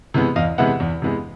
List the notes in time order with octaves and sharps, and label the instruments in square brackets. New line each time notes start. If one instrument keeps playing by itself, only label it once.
[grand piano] C3 E3 G#3 B3
E2 D#5 F5
C3 E3 G#3 B3 E5 F#5
E2
C3 E3 G#3 B3